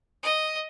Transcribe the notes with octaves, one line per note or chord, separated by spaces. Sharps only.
D#5